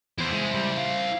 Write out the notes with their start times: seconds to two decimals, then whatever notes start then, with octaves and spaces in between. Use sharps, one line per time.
0.18 E2 E4 C5
0.32 G#3
0.54 G3
0.78 F5